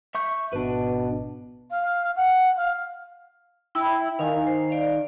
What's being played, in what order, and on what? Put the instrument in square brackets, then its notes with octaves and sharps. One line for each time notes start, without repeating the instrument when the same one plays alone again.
[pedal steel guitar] E5 C#6 G6
[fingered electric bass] G#1 [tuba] B2 [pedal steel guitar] D4 B4
[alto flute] F5
F#5
F5
[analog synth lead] E4 [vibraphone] G5
[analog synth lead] D#3 [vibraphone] F5 G#5
[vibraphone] C5
D5 F5